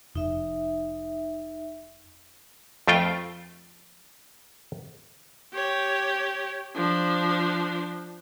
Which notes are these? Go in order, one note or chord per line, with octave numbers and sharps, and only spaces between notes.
F1 D#4 E5
F2 A3 F4 G5
G4 C#5
F3 D4